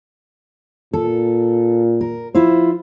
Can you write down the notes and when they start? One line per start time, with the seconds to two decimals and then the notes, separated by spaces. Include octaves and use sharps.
0.93 A#2 A4
2.01 A#4
2.35 F3 E4 F4 C5